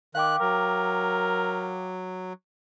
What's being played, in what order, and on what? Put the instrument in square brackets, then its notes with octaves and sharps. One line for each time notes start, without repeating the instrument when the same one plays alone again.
[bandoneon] D#3 F#6 [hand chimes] F5 G5 D6
[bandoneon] F#3 [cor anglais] A#4